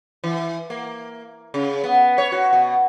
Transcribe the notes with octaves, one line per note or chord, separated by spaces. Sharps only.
E3
A#3
C#3
B3
C#5
F#4
B2